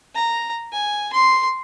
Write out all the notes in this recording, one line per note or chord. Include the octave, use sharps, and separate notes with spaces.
A#5
G#5
C6